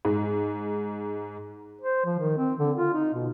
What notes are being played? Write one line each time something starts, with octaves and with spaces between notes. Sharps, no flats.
G#2
C5
F3
D#3
C4
D3
F4
D#4
B2